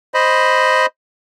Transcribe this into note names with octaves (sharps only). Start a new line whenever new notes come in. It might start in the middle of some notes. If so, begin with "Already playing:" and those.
C5 D#5 B5